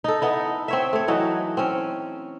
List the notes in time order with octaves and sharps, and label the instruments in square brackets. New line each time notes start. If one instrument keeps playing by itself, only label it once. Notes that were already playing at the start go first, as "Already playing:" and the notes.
[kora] D#4 A4
B3 D#4 E4
C4 C#5 E5
A3 C#5
E3 F#3 D#4
C4 C#4